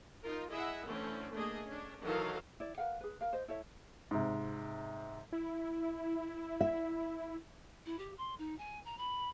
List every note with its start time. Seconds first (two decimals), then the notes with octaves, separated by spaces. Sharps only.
0.23 D#4 F4 A#4
0.51 E4 G#4 D#5 E5 F#5
0.87 D3 E3 A3 C4 C#4
1.34 A3 A#3 D4 G#4 D#5
1.68 C#4 D4
2.02 D#3 E3 F#3 D#4 A4 F5
2.60 E4 D5
2.78 A#4 B4 F5 F#5
3.01 G#4 B4
3.21 A#4 F5
3.33 C5 D#5
3.48 E4 A4 C#5 E5
4.11 G#2 C3
5.32 E4
6.61 E5
7.86 E4
7.98 G4
8.17 C6
8.38 D#4
8.58 G#5
8.85 A#5
8.98 B5